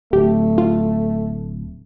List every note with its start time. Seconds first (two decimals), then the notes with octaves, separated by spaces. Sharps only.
0.13 D1 A3 G4
0.58 F4